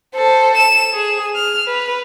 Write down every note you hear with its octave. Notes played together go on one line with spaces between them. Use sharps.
A4 C5
E7
G#4
F6
B4